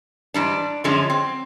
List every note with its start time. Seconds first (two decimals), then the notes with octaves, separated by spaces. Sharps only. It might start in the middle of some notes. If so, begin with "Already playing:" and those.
0.34 G#2 E3 G3 D4
0.84 F#2 D3 F3 G#3 C#4
1.10 C4